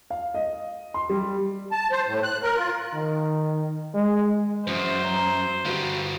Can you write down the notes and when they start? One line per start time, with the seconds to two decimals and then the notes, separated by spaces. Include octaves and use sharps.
0.10 F5
0.34 D#5
0.94 C6
1.09 G3
1.71 A5
1.91 C5
2.07 A2
2.23 F#6
2.43 A#4
2.57 F4
2.94 D#3
3.94 G#3
4.67 F#2 E3 F#3 C5 D#6
5.04 A#5 F6
5.65 D3 G3 F#4 B4 F5